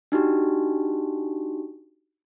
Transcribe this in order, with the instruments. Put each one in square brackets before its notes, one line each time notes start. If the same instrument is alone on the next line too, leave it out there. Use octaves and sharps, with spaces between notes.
[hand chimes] D4 D#4 F#4 G4